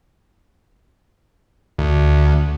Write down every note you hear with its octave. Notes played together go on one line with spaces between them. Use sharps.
D2